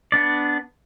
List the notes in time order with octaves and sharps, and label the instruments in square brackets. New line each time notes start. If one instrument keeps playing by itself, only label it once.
[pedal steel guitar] B3 D4 D5